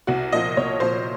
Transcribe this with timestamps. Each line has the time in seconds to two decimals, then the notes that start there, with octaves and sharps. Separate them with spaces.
0.07 C2 F#4
0.32 A#2 F3 D#5
0.57 C2 C#5
0.80 A#2 F3 C5